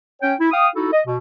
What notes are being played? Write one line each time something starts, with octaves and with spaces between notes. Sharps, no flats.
C#4 C#5 G5
E4
F5 G5 D#6
D#4 E4 F#4 A4
D#5
B2